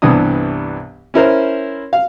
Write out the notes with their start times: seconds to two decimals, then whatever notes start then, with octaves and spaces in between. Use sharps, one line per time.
0.02 C2 G2 E3 B3 D4 D#6
1.14 C#4 E4 A#4 C5
1.93 F5